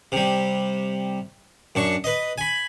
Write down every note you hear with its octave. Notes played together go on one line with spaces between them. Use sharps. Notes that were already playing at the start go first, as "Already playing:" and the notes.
C3 G3
F#2 D4 C#6
B4 D#5
G#5 B5